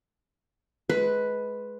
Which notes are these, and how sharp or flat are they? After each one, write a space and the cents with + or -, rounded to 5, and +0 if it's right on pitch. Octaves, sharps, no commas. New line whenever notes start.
G#3 +25 B4 +0